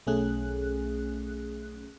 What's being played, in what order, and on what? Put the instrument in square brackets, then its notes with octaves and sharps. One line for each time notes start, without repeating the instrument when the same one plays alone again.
[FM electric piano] B1 A3 C#4 G#4 F#6